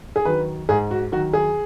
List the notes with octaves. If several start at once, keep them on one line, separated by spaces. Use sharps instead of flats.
G#4
D#3 F#3 B4
G#2 G#4
F#4
D#3 F#3 F#4
G#4